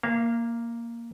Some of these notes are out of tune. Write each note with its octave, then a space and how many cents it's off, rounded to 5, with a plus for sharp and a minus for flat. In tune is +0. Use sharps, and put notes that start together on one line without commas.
A#3 +0 F5 -30